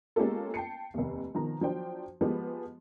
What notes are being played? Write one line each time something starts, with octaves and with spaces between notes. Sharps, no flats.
G#3 A#3 C#4 F4 G4 A4
G5 A5 C7 C#7
F1 D#2
B2 D#3 F3 A#5
F3 F#3 D4 C5 G5
F3 G#3 B3 G4